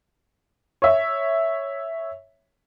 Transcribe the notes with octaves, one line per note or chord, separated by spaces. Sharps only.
C#5 E5